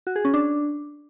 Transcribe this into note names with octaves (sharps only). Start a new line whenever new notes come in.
F#4
G#4
C#4
D4